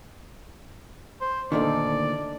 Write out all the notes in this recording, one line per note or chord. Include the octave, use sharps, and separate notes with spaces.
C5
D2 A#2 D#3 D4 D#4 A4 D5